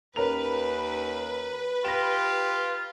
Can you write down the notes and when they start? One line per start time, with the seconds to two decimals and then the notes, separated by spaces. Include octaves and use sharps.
0.16 D#2 C#4 A#4 B4 F7
1.85 F4 G4 A#6 E7